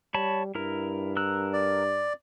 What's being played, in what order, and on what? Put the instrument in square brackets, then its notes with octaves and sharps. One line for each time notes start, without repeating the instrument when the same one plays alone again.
[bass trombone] G3 [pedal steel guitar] C#5 A5 B5
[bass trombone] G2 [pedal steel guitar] E4 A#4
[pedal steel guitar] A#4 E6 F#6
[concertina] D5